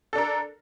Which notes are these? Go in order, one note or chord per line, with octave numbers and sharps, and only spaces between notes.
D4 A4 A#4